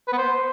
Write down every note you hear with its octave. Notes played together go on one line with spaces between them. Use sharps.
B4
B3
C5